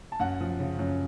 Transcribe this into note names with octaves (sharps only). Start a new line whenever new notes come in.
A5
F#2 F#5
F3
C#3
F#2